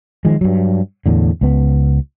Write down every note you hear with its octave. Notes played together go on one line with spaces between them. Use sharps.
D#3 F3 G#3
G2 F#3
E2 A2 D3
C#2 B3